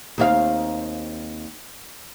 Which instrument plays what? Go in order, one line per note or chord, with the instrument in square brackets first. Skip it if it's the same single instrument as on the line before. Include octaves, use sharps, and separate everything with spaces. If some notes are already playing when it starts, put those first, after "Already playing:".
[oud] D#2 C4 F5